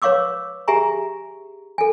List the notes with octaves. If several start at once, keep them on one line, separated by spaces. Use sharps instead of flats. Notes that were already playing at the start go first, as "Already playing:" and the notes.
B4 C#5 F5 C#6 D6 E6
G4 G#4 E5 G#5 A#5 C#6
A4 G#5